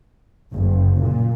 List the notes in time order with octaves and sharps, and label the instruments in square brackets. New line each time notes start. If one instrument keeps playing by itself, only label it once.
[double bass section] F#1
A#2